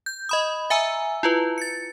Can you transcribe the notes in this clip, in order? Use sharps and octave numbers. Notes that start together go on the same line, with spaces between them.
G6
D#5 B5 D#6
E5 G#5 A#5 E6
E4 F4 B4
A6 C#7